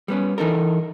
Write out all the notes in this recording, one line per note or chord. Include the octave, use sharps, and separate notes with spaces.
G3 B3 C#4
E3 D#4 A4 A#4